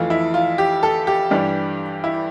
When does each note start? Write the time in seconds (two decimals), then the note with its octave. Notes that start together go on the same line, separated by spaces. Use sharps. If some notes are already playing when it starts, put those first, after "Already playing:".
Already playing: F2 E3 A3 F4
0.10 E4
0.34 F4
0.58 G4
0.83 A4
1.07 G4
1.31 G2 E3 G3 D4
2.04 E4